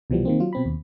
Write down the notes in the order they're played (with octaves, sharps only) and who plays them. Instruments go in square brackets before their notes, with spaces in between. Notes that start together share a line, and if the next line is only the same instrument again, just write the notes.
[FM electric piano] C2 B2 E3 F3 G3 B3
D#3 A#3 C4
F#3 F4
B2 C4 B5
D#2